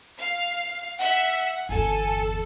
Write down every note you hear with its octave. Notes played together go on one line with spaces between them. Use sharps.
F5
E5 F#5
G1 E2 A4 G#5